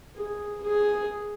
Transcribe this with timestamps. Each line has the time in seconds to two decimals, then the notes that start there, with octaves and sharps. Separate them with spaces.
0.16 G#4
0.62 G#4